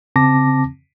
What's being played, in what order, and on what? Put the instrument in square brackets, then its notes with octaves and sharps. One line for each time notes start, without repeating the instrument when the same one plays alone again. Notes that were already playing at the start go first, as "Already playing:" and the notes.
[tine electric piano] C#3 C4 A5 D6 A#6